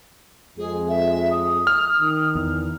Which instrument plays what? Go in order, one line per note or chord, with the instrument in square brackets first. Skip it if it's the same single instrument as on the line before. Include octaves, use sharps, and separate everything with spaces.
[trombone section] F2 G#3 [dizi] G#4
[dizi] E5
D#6
[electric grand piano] F6
[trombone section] D#3
[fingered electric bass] E2